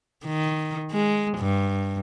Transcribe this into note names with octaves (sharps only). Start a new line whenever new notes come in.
D#3
G#3
G2